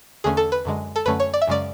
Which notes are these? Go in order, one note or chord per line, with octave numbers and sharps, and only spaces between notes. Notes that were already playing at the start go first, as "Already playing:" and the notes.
E2 D3 A3 C#4 G#4
A4
B4
F#2 D3 G#3
A4
F#2 D3 A3 C#4 B4
C#5
D5
E5
F#2 C#3 G#3 C#4 D5